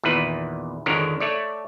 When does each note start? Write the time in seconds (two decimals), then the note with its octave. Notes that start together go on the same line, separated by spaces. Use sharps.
0.03 E2 A#2 D#3 E4 B4
0.86 G#1 F2 D3 D#3 A#4 C#5
1.20 A3 C#5 D5